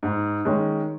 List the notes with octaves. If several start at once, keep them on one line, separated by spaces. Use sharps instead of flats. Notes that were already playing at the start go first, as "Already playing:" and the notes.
G#2
D#3 G#3 C#4